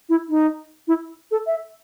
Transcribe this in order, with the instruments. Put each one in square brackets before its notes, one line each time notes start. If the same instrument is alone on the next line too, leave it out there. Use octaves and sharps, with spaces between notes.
[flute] E4
D#4
E4
A4
E5